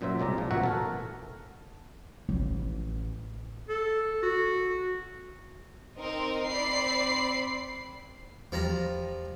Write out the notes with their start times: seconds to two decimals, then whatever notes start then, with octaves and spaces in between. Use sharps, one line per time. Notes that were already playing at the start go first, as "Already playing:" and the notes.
0.01 F#2 A#2 F#3 C5 E5
0.20 C2 G#3 D5 A#5
0.38 A#2 F3
0.51 A1 B2 F#4 E5 F#5 A#5
0.63 A4 A#4 G#5
2.29 A1
3.69 A4
4.22 F#4
5.98 C4 D#4 A#4
6.49 C4 D5 B5 C7
8.52 E2 F3 G3 A#5